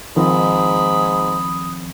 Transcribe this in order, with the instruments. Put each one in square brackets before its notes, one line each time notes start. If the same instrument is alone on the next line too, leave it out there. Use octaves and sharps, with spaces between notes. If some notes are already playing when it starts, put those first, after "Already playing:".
[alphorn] G#2 [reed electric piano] D#3 F3 C4 [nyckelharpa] B5 [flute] D#6